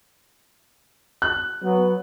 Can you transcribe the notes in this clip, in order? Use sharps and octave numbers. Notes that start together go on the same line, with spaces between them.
F#6
F#3 B3